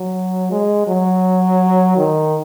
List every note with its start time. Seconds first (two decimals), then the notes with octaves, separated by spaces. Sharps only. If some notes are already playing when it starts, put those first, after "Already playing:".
Already playing: F#3
0.51 G#3
0.88 F#3
1.98 D#3